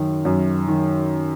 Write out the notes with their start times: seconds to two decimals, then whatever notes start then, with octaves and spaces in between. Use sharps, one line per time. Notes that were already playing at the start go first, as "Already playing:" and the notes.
Already playing: F#2 D#3
0.25 F#2
0.68 D#3